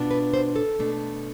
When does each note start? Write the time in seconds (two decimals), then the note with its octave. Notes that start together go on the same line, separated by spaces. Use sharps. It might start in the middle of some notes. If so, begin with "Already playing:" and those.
Already playing: B2 B3 D4 F4
0.11 B4
0.34 C5
0.56 A4
0.79 B2 A3 D4